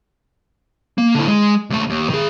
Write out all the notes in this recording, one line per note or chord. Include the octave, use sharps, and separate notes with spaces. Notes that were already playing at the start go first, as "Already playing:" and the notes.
A#3
D3 E4
G#3
D#2 A3
D#2
D#3 G#4